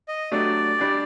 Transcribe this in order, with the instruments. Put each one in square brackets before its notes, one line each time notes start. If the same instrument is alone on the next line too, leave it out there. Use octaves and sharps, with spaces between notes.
[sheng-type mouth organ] D#5
[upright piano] F#3 A3 D4 G4 [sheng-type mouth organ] D5
[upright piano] G3 D4 G4